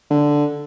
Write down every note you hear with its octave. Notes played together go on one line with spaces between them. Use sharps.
D3